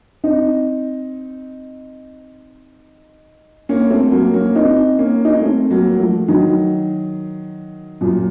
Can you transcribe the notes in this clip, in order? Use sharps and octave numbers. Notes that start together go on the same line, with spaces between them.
C4 D#4
A#3 C#4
A3 C4
F#3 A#3
A#3 C#4
C4 D#4
A#3 C#4
D#4
C#4
A3 C4
F#3 A#3
F#3
F3 A3
D#3 F#3
F#2 A#2